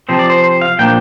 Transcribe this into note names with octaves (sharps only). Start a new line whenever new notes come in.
C3 F3 C4 C5
D5
C5
C5
F5
A#2 F3 A#3 D4 G5